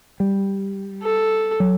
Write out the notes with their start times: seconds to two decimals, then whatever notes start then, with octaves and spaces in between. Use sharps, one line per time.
0.20 G3
1.03 A4
1.60 F#3